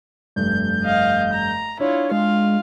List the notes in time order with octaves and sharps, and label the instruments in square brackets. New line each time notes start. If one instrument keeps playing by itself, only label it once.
[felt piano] F1 G2 [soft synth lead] G6
[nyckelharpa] D#5 F5
A#5
[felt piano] D4 [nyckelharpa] E4 F4 [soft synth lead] C#5
[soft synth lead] G#3 [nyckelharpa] F4 F5